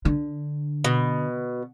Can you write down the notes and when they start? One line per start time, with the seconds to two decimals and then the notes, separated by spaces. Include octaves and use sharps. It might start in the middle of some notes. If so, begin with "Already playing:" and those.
0.05 D3
0.84 B2